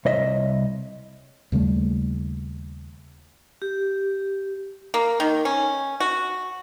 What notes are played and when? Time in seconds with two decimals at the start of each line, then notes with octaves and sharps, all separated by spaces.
0.05 C2 C#5 D#5 E5
1.52 D#2 C#3 G3 A3
3.62 G4
4.94 A#3
5.20 D#3
5.45 C#4
6.00 F#4